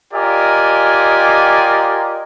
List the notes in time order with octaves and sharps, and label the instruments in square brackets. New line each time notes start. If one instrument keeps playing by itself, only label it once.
[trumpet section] F4 G4 A#4 D5 D#5 G#5